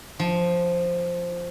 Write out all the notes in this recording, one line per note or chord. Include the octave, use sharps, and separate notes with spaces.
F3